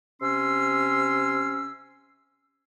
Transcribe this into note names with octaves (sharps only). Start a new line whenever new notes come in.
C3 C#4 C6 E6